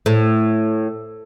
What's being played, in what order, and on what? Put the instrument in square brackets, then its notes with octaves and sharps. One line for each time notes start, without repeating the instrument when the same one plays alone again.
[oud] A2